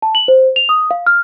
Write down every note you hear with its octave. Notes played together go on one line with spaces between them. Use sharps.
A5
F#7
C5
F7
D#6
F5
F6